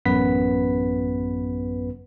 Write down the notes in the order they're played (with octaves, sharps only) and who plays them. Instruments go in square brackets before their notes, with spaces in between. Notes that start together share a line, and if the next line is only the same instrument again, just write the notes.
[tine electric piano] A1 F#2 B3 B4 B6